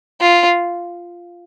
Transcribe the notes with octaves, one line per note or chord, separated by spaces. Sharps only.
F4